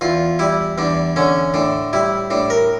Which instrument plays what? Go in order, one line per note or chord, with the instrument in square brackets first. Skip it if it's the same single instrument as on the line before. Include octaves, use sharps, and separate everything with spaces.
[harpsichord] E2 F4
G3 E4
E2 D4
D3 C#4
A2 D4
G3 E4
A2 D4
A#4